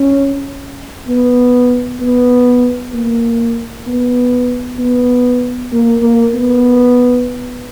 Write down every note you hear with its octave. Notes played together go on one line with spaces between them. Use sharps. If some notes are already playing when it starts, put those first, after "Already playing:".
Already playing: C#4
B3
B3
A#3
B3
B3
A#3
A#3
B3